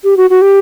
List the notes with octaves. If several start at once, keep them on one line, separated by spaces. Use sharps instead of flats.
G4
F#4
F#4
G4